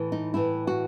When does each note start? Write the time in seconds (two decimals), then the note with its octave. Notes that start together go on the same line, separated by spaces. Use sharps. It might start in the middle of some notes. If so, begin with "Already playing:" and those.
Already playing: A2 E3
0.12 D#4
0.34 A2 E3 E4
0.67 F#4